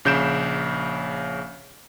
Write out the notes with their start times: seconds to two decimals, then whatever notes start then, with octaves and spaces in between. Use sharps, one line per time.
0.05 A#1 C#3 G6 D7 E7